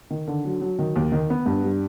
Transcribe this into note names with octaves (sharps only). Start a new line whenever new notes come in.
D#3
D3
F#3
F#3
D#3
D#2
D#3
B3
G2
G3